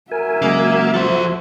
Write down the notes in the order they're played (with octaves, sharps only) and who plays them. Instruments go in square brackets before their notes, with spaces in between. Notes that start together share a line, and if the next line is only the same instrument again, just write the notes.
[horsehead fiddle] F#4 E5 [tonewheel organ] A#4 G#5
[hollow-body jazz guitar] C#3 F#3 G#3 [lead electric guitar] A#3
[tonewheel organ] F3 [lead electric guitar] A4 C5